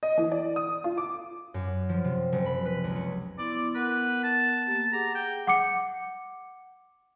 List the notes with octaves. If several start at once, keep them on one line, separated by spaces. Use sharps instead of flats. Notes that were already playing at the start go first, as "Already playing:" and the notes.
D#5
E3
D5
D#6
F4
D6
F#2
F3
C3
F#1
B5
B4
C#2
C#4
B3 E4 D5 C6
B3 A#4 B4 F#5
A5
A#3 G4
G#4 F#5 A#5 D6
G5
F#5 D6 C#7